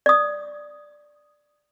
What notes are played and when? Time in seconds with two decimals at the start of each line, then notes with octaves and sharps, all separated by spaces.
0.06 D5 D#6